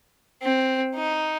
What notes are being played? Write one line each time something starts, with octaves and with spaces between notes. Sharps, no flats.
C4
D#4